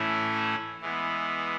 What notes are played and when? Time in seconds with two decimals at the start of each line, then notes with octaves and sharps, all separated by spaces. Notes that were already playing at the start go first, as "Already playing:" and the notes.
Already playing: A2 E3 A3 C#4 E4
0.81 E3 G#3 B3